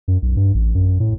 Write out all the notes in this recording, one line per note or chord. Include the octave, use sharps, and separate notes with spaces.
F#2
B1
G2
A1
F#2
A2